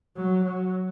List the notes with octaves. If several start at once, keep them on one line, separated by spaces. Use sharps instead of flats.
F#3
F#3